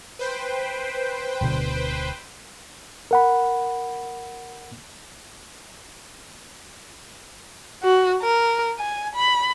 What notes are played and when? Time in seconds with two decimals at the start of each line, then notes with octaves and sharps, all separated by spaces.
0.19 B4 C5 G5
1.41 D1 B2 D3
3.11 A#4 F#5 B5
7.83 F#4
8.22 A#4
8.79 G#5
9.15 B5